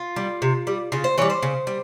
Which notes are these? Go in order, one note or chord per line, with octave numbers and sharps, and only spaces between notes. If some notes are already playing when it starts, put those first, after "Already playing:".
Already playing: F4
G3
C3
G3
C#3 F4
C5
E3 G3 C#5
C5
C#3
G3